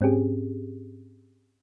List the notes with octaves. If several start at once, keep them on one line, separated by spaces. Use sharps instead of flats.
G#2 C4 C#4 G4 G#4